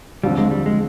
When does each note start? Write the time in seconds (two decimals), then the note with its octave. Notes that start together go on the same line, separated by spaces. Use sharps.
0.23 D#2 D3 F3 G3 C4
0.38 G#3
0.51 G3
0.66 G#3